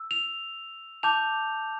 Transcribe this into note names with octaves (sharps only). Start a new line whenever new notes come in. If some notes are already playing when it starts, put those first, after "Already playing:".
Already playing: E6
F7
A5 D6 G6 F7